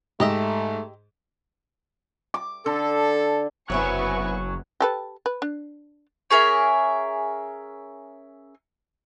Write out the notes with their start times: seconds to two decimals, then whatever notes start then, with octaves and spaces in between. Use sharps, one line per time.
0.20 G#2 A3 G4 D#5 E5
2.34 D6
2.66 D3 A4
3.70 F#1 C3 F#3 B3 E4 E5 G#5 C#6
4.80 G4 A4 B4
5.26 B4
5.42 D4
6.31 C#4 G#4 A#4 E5